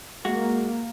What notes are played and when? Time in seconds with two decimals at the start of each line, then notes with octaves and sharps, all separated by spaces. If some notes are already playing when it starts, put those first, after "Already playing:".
0.25 G#3 A#3 F#4